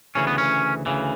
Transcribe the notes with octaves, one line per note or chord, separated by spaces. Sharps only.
D2 C#3 E3 C#4
B3
C#4
D2 C#3 E3